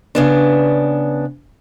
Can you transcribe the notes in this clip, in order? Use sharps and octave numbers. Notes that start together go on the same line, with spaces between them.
C#3 B3 D4